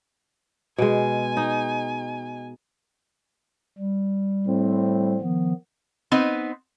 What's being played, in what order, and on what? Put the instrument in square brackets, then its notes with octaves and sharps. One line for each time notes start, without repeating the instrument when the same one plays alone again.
[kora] B2 G#3 [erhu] G#5
[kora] D#4
[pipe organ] G3
[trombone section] A2 C4
[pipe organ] D#3 F3 B3
[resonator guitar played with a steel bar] B3 C4 D#4 B4